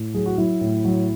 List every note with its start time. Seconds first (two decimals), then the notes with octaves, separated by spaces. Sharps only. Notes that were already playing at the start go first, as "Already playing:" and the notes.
Already playing: A2
0.14 F#3 G#4
0.26 F#4
0.38 F#3 E4
0.61 A2
0.85 F#3